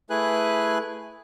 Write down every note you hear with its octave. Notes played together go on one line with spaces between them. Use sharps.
A3 E4 G#4 B4 G#5 F#6